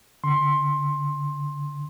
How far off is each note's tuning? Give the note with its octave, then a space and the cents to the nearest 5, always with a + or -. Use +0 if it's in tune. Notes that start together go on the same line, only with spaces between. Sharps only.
D3 -25 C6 +15